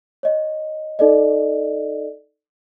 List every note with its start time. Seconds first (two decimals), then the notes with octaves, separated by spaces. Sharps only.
0.23 C#5 D#5
0.99 D#4 A4 D5 D#5